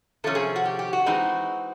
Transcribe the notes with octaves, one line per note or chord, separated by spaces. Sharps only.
C3 F3 A3 C#4 A4
G#4
F#4
G4
G4
F#4
E3 G#3 C4 D#4